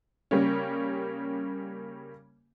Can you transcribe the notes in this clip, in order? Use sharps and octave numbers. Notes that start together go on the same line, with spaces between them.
C#3 G3 A#3 C#4